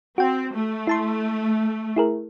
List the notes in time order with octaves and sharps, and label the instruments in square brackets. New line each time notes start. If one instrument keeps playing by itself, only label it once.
[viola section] C4 [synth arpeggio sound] F#4 G5
[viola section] A3
[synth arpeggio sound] E4 A5 C6
E4 G#4 A#4